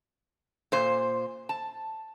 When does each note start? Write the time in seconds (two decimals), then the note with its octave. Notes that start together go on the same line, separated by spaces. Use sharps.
0.72 A#2 C5
1.49 A5